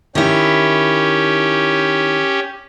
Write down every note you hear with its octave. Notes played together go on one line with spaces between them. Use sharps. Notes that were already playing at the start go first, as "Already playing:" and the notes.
D#3 C#4 E4 G4